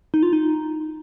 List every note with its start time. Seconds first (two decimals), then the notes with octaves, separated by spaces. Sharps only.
0.14 D#4
0.23 F4
0.33 D#4